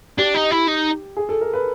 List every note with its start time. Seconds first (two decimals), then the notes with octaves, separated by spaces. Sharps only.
0.18 D4 G4
0.35 D#4
0.51 E4
0.68 D#4
1.17 G#4
1.29 A4
1.41 A#4
1.53 B4